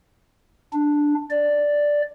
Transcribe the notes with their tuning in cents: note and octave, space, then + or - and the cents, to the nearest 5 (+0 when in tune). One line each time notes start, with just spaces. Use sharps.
D4 +0
D5 +0